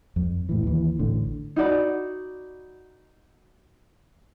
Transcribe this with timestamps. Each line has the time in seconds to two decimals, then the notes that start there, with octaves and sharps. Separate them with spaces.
0.16 F2
0.49 A2 E3
0.63 D#2 E3
0.99 A1 A2 D3
1.56 D#4 F#4 D5 B5